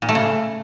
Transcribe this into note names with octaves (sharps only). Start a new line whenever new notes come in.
A#2
A3
C#3